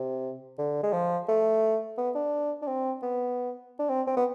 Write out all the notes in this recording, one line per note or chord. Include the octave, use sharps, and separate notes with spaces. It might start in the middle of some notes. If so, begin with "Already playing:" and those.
Already playing: C3
D3
G#3
F3
A3
B3
D4
D4
C4
B3
D4
C4
C4
B3